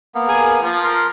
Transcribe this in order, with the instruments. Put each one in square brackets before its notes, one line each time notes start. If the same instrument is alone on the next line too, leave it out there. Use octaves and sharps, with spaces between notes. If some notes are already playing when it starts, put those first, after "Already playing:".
[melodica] A#3 B3
[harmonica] G#4 A#4
F3
[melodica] A#4 C6